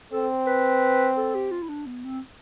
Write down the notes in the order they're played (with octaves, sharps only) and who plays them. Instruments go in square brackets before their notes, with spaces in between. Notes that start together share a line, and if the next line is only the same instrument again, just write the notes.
[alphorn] C4 [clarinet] A4
[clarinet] B4
A4
G4
F4
E4
D4
B3
C4